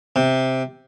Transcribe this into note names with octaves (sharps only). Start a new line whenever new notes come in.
C3